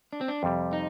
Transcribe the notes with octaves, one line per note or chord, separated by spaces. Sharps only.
D4
C4
D4
F2 C3 G3
D#4